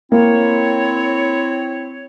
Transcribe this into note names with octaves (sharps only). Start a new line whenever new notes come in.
A#3 C4 E4 C#5